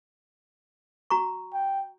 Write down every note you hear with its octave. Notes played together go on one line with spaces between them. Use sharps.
F#4 A#5 C#6
G5